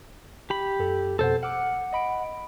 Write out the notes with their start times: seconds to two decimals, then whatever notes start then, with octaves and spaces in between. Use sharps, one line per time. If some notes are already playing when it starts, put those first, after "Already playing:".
0.50 G4 B5
0.79 F#2 A4
1.19 F2 B2 A4 C5 F#5
1.43 F#5 D6 E6 F6
1.93 D#5 B5 D7